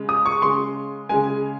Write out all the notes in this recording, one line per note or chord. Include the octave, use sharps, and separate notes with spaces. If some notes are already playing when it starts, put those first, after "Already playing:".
Already playing: C#3 G#3
D#6
C#6
C#3 G#3 C6
C#3 G#3 G#5